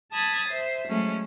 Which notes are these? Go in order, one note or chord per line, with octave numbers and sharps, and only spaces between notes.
A5 B5 D#6 G#6 A6
C5 E5
F#3 G#3 A3 C#4